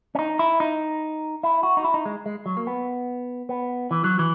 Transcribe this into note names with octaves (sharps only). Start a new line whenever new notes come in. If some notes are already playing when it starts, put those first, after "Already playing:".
C#4
D#4
E4
D#4
E4
F#4
D#4
E4
D#4
G#3
G#3
F#3
A#3
B3
B3
E3
F#3
E3